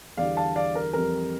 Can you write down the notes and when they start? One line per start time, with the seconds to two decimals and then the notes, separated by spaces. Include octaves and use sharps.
0.17 E2 D3 G3 D5 F5
0.37 F5 A5
0.56 D5 F5
0.75 A#4
0.93 F2 E3 G3 A#4